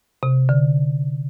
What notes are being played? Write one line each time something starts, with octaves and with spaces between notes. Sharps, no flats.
C3
D3